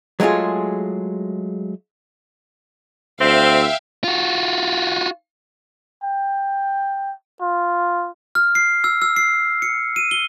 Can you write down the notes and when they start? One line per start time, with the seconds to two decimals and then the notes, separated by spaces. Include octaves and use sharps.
0.20 F#3 G#3 A3 F4 G#4
3.20 D2 C4 E5 F5 G5
4.04 F4 F#4
6.03 G5
7.41 F4
8.35 F6
8.55 C7
8.84 E6
9.02 E6
9.16 C7
9.62 C#7
9.96 D#7
10.11 G7